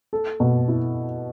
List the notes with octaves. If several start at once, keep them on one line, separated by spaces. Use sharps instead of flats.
A4
B2
E4